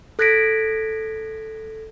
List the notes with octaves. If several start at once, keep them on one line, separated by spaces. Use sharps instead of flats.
A4 F#6 G#6 A#6 B6 D7